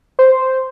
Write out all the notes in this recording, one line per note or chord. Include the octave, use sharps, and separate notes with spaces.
C5